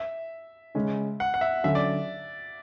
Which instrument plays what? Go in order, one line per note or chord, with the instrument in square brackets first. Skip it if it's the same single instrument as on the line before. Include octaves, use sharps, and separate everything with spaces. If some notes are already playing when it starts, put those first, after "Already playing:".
Already playing: [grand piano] E5
[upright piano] C#3 G#3 C#4
[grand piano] F#5
F#5
E5
[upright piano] D3 F#3 C#4 [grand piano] E5
[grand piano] D5